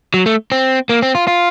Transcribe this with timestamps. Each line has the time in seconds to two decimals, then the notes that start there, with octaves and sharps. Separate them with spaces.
0.14 F#3
0.26 A3
0.52 C4
0.89 A#3
1.02 C4
1.15 F4
1.27 F4